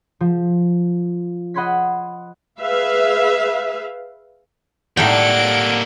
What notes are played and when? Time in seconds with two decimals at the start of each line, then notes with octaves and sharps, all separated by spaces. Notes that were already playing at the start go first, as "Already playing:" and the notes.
0.21 F3
1.54 D#5 F#5 B5 C6 G#6 B6
2.60 G#4 B4 E5 F5
4.97 A2 G3 A#3 D#4 A4 F#5 G5 D7